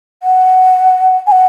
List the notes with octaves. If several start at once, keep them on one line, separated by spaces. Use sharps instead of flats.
F#5
G#5
F#5